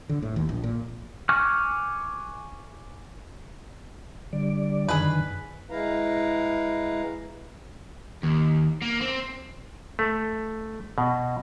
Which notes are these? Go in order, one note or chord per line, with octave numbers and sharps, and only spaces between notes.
D3
A2
D#2
A#1
A#2
G#5 C#6 D6 F6 F#6
D3 G3 D5
F#2 D3 D#3 G#4 B4
G#3 E4 B4 F5 A#5
D#2
A#3
C4
A3
B2